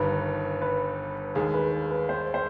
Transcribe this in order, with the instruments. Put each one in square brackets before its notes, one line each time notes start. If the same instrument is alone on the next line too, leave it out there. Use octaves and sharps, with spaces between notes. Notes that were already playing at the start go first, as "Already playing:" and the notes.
Already playing: [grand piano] G1 G2 D#3 [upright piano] B4
[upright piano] B4
[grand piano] D#2 D#3 G#3 [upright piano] G#4
[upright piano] B4
B4
C5
C5